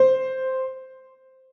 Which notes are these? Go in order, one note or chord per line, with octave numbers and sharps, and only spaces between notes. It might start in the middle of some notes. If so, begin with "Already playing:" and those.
Already playing: C5